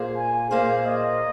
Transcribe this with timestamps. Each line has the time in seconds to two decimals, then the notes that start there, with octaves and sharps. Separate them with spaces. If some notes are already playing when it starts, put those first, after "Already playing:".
Already playing: A#2 A#3 G#4 C5
0.16 G#5
0.50 A#2 A#3 G#4 C5 F5
0.86 D#5